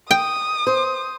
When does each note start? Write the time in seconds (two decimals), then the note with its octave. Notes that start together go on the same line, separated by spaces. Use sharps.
0.11 G5 D#6
0.67 C5